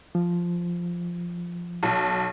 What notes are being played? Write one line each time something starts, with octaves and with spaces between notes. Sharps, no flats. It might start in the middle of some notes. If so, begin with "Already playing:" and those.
F3
B1